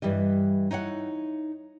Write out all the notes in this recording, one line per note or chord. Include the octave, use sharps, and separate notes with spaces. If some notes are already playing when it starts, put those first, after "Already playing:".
G2 E3 G3 D#5
D#4 E4 C#5 F#5